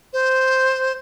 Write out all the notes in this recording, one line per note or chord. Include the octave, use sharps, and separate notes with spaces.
C5